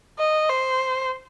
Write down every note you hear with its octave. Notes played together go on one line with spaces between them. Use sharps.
D#5
C5